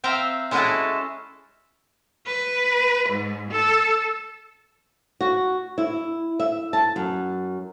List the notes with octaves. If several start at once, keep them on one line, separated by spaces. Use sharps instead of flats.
C4 E5 F5 G5 A#5
G#3 C#4 E4 F#4 G#4 A4
B4
G#2
A4
F#4
E4
E5
A5
F#2